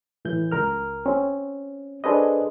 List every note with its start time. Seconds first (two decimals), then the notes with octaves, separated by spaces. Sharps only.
0.25 A2 E3 G6
0.52 C#2 A#4 F6
1.06 C4 C#4
2.04 D4 G#4 A4 B4 C5 D#5